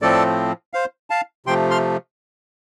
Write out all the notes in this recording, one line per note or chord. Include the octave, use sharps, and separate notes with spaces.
A2 F3 A3 C4 A4 D5
C5 F5
F5 A5
C3 F3 A3 G5 C6
C6 F6